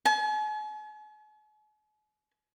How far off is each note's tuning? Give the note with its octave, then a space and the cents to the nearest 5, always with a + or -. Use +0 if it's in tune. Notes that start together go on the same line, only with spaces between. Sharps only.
G#5 +45